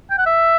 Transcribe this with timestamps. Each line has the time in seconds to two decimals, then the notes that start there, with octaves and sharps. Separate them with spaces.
0.10 G5
0.18 F#5
0.26 E5